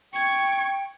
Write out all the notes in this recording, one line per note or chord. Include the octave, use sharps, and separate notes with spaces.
G5 C#6 G#6